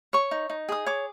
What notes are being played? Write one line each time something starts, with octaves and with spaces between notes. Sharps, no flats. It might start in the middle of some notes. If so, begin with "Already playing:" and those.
C#5 C#6
D#4
D#4
G#4 D#6
C#5 D6